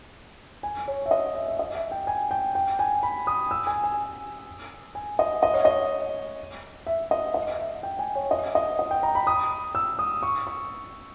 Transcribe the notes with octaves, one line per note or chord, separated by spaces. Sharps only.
G#5
C#5
E5
D#5
E5
E5
D#5
E5
G5
G#5
G5
G5
G#5
B5
D#6
E6
G#5
G#5
G#5
D#5
D#5
C#5
D#5
E5
D#5
D#5
E5
G5
G#5
C#5
D#5
D#5
D#5
G5
A#5
B5
D#6
E6
D#6
C#6
C#6